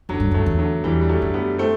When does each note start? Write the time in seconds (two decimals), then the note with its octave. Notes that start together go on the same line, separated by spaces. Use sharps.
0.09 F#2 D3 F#3
0.20 G2
0.31 F#2 F#3 A3
0.46 E2
0.59 D3 F#3
0.84 E2 E3 G3
1.01 G3
1.09 F#3 A3
1.22 F#2
1.34 G3 B3
1.58 A3 C4